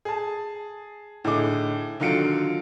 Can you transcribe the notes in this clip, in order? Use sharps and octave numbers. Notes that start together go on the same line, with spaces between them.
G#4 A5
A2 D3 D#4 G#4 D6
D3 D#3 F#3 F4 C#7 D7